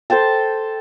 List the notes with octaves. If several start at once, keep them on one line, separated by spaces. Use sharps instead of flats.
A4 C5 G5 A5